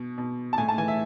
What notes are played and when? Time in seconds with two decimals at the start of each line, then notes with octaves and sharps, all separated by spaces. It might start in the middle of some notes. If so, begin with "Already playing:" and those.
Already playing: B2
0.18 B2
0.53 A5
0.58 A2 G#5
0.68 A5
0.78 E3 G#5
0.88 E5